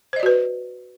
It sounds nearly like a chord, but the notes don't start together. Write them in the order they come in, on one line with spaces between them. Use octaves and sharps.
C5 D#5 D5 F#4 B4